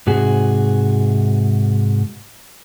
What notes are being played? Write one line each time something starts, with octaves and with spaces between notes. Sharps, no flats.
G#2 C3 F#4 G#4